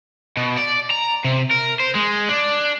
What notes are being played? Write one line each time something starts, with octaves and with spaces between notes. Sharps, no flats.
B2
D5
A#5
C3
A#4
C5
G#3
D4